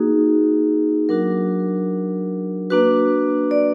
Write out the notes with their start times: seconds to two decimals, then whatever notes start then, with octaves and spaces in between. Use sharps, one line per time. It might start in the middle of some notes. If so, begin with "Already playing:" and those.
Already playing: A#3 D#4 F#4 G#4
1.09 F#3 D4 F#4 A#4
2.70 A#3 D4 F#4 B4
3.51 D5